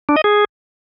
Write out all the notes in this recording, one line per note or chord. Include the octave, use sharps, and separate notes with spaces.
D4
D#5
G#4